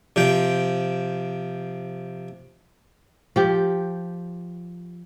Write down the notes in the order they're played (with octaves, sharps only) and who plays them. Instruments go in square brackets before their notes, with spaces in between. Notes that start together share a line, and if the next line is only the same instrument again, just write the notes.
[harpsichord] C3 F3 G5
[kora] F3 G4